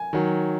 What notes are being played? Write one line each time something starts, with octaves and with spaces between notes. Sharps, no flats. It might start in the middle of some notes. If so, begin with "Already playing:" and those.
Already playing: G#5
D#3 F#3